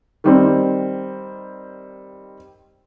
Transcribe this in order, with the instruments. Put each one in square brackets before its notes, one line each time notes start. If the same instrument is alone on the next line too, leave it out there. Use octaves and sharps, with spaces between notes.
[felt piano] D#3 G3 C4